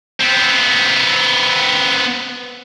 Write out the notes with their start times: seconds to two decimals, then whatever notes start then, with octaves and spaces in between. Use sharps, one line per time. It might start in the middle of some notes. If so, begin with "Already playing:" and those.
0.21 B3 C4